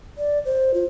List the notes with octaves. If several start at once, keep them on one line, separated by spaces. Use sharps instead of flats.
D5
C5
F4